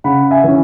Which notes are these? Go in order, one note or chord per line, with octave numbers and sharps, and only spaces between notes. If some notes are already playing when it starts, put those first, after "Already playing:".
C#3 F#5 B5
E5 G#5
E3 C#4